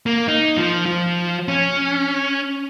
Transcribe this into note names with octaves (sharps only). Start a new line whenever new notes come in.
A#3
D#4
F3
F3
C#4